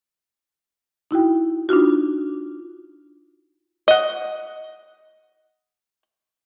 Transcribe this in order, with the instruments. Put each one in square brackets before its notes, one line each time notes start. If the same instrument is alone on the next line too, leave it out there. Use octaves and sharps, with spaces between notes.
[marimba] D#4 E4 F#4 G5
D4 D#4 F4 F#4
[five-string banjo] D#5 F#5